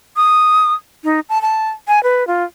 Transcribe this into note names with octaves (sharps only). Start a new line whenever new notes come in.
D#6
D#4
A5
A5
G#5
B4
F4